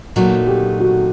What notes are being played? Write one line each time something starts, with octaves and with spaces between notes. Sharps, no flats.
A#2 F#3 A3 D#4 F#4
G4
F#4